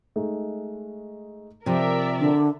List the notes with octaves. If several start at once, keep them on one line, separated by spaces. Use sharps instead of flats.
G#3 A3 D#4
C3 F3 A#4 C5 D5 E5
D3